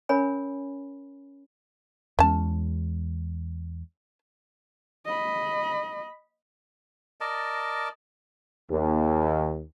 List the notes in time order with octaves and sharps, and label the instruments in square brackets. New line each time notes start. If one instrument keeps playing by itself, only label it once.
[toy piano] C#4 A#4 C#5 G#5 B5
[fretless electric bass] E2 G#3 [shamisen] C#4 A5
[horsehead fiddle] D#5 B5
[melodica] A#4 D5 D#5 A5
[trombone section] D#2